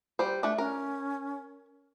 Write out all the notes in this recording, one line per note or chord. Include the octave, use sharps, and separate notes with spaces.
G3 C5
A3 D4
C#4 A#4